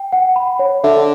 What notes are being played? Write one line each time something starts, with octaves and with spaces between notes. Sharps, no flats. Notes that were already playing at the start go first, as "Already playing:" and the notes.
Already playing: G5
F#5
B5
C#5
D3 E5